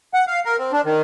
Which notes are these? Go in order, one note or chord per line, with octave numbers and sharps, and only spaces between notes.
F#5
F5
A#4
C4
D4
D#3